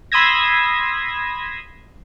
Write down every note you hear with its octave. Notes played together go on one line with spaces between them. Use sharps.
B5 C6 D#6 E6 G#6 A#6